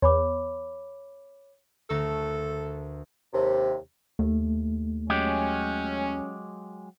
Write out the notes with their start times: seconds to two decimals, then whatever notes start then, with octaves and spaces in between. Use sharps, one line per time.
0.02 E2 C#5 B5 D6
1.90 D2 A3 A4 A#4
3.33 D#2 C3
4.19 D#2 A3
5.10 F#3 G#3 C#4 G4